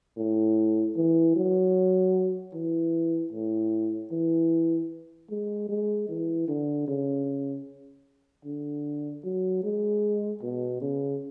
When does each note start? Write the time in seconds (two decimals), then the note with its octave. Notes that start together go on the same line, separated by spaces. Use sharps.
0.17 A2
0.96 E3
1.36 F#3
2.54 E3
3.33 A2
4.11 E3
5.30 G#3
5.69 G#3
6.09 E3
6.48 D3
6.88 C#3
8.45 D3
9.24 F#3
9.64 G#3
10.42 B2
10.82 C#3